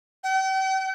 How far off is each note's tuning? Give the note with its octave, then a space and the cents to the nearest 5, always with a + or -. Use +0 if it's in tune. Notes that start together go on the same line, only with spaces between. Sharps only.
G5 -45